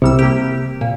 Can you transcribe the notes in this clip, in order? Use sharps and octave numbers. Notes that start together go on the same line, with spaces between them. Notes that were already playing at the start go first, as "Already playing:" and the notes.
C2 C3 G3 E6
A#3 G4
A#2